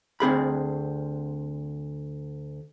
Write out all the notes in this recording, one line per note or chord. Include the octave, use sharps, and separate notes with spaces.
D2 C4 G#4 B5